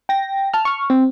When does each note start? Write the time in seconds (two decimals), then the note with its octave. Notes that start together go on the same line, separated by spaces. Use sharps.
0.09 G5 A#6
0.54 A5 F6
0.65 C#6 F6
0.90 C4